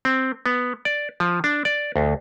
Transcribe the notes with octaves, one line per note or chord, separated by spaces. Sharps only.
C4
B3
D5
F3
D4
D5
D2